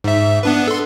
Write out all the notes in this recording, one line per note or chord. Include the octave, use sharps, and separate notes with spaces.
G#2 E5
B3 D4 B4
A4 C6